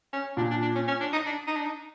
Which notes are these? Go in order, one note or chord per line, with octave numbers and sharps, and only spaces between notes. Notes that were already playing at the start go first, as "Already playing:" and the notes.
C#4
A#2 D4
D4
D4
C#4
C#4
D4
D#4
D4
D#4
D4
D#4